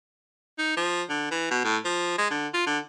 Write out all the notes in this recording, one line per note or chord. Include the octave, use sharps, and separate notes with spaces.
D#4
F3
D3
E3
B2
A2
F3
G#3
D3
F4
D3